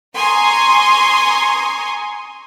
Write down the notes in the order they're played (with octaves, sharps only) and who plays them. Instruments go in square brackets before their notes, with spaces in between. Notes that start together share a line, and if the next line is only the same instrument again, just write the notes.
[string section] G#5 A#5 C6 C#6 D#6